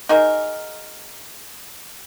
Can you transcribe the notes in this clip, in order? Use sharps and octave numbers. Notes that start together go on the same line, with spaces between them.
D#4 F#4 G#4 A#4